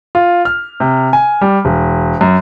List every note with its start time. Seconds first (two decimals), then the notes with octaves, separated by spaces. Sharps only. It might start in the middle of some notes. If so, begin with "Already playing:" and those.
0.15 F4
0.45 F6
0.80 C3
1.13 G#5
1.41 G3
1.65 E1
2.21 F#2